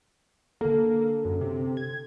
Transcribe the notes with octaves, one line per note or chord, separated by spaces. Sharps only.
D3 A#3 A4
F#2
C3
G#6